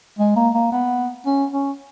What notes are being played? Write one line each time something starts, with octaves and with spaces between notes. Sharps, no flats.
G#3
A#3
A#3
B3
C#4
C#4